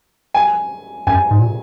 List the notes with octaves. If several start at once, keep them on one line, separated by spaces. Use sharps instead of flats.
G#5
F#2 G#5
G#2
A#2